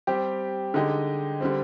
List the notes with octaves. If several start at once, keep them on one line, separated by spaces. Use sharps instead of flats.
G3 C4 G4
D3 G#3 D#4 G4
D3 G3 C4